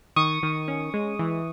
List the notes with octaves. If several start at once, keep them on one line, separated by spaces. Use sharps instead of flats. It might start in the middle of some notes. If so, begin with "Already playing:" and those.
D#3 C#6 D#6
D#3
C#4
G#3
E3